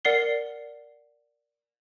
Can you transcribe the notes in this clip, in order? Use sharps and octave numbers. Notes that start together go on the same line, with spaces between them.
A#4 D5 F#5 C7 G7